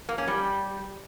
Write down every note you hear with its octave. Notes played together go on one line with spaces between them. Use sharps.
A#3
C#4
G3